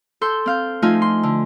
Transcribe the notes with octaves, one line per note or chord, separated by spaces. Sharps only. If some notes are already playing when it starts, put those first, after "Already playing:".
A4 C6 G6
C4 F5 G6
F3 A3 D#4 F4 G#5
C6
D3